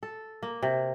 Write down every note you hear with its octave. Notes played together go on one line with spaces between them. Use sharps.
A4
A#3
C3